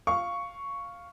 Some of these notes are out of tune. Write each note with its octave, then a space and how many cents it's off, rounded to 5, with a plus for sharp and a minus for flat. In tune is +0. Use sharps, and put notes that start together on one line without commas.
F5 +0 C#6 +5